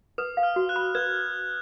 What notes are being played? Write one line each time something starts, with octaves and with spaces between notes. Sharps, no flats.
B4 D#6
F5
F6
F#4
F#6
B5
B4 G#6